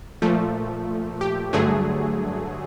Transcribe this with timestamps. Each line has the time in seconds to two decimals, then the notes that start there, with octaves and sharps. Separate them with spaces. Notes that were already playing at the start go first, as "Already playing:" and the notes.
0.22 A#2 F3 A3
1.21 G4
1.53 G2 D3 F#3 A3 G#4